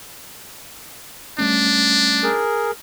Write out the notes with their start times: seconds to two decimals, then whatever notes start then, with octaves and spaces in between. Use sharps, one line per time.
1.39 G3 A3 C#4 D4
2.23 G#4 A#4